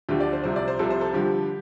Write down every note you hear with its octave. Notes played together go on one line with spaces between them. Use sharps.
D2 D3 F3 G4
D5
C5
C2 C3 F3 C5
D5
C5
C2 C3 F3 A4
C5
A4
G2 D3 F3 G4